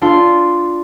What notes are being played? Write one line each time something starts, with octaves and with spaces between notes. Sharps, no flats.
D4 F4 A4 C6